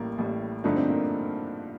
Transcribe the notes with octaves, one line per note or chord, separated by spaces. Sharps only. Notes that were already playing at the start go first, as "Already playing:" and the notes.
Already playing: A1 A2 G3 A#3
A1 A2 G3
G2 D3 F3 A3 D4 D#4
C4
A#3